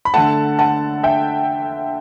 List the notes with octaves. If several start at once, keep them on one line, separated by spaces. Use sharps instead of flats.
B5
D3 A3 F#5 A5
F#5 A5
E5 G5